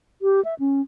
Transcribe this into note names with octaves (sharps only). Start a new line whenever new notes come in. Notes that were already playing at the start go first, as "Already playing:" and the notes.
G4
E5
C#4